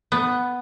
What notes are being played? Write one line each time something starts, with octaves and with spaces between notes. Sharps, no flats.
B3